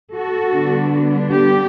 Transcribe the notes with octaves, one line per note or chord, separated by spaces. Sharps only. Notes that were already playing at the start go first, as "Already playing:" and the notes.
F#4 A4
D3 G3 B3 D4
G4